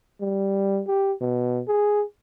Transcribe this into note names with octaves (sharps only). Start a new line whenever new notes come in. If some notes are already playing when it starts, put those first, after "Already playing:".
G3
G4
B2
G#4